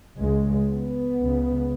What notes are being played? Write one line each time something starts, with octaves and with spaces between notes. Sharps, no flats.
C#2 C#3 G#3
B3
C#2 C#3